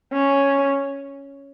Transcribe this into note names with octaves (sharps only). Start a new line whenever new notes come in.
C#4